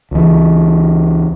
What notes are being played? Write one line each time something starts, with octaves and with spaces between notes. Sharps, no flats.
C#2 E3